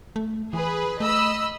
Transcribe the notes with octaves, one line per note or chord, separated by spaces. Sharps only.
A3
E3 G#4 B4
A3 D#5 B5 E6